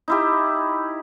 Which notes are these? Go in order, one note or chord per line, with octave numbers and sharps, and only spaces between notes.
D#4 E4 G4